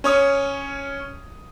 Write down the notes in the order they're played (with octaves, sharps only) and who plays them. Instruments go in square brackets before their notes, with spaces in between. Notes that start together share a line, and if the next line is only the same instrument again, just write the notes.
[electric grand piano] C#4 C#5 D#6